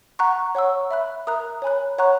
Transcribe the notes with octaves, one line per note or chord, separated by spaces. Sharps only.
F#5 A#5 C#6 F#6
C#5 F#5 C#6 E6
E5 B5 F#6
A#4 E5 A#5 D#6 F#6
C#5 G#5 B5 F#6
C#5 F#5 A#5 C#6 F#6